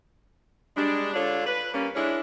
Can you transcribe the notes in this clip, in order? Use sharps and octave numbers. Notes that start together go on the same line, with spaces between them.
G3 G#3 D4
D3 D4 F4 A4 C#5
B4
G3 A#3 C#4
G#3 C#4 D4 E4 C#5